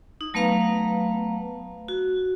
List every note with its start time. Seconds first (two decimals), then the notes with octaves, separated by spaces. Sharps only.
0.21 D#4
0.34 F#3 A3 B3 B4 F5 A#5
1.88 F#4